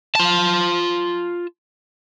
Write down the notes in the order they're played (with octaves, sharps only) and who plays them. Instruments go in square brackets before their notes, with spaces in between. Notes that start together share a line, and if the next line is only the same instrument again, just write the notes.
[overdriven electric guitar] F4 A5